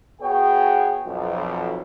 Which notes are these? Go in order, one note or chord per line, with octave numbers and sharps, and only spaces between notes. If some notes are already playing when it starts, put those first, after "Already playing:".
B3 F#4 G#4 C#5 G5
B1 F2